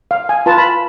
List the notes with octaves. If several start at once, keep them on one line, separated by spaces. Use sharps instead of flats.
F5
G#5
F4 B4 A5
B5